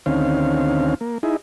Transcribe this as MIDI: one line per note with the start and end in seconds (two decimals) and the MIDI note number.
0.06 0.94 38
0.06 0.94 51
0.06 0.94 60
0.06 0.94 61
0.06 0.94 77
1.01 1.18 58
1.23 1.37 63
1.23 1.37 64
1.23 1.37 68